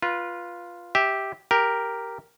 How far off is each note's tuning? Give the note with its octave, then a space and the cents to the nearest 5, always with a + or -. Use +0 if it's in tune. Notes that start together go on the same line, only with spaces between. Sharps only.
F4 +0 B4 -20
G4 +0 E5 -15
G4 +0 A#4 +0